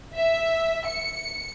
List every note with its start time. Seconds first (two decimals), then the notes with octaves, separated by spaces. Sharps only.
0.15 E5
0.88 C#7